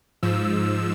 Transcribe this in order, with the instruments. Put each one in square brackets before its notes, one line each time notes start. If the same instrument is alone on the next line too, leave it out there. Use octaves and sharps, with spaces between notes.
[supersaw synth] G#2 F3 E6